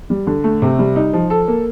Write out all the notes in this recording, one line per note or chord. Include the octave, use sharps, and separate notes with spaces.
G3
D3
A3
C3
G3
D#4
F3
A4
A#3